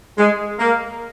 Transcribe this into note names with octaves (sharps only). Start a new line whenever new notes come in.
G#3
A#3